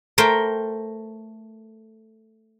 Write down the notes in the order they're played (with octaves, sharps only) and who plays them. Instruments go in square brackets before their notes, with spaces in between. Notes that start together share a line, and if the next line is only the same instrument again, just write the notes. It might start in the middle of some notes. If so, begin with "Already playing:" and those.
[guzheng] A3 A#4 C5 G5